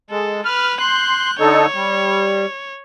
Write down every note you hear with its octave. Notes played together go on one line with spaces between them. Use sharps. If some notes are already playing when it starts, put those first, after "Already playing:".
G#3 A4
B4 F6
C6 F#6 G6
D3 D#4 A4 C#5
G3